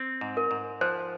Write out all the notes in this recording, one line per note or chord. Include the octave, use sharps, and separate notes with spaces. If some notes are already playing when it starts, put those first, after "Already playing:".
Already playing: C4
G#2
A#4
G#2
F3 C5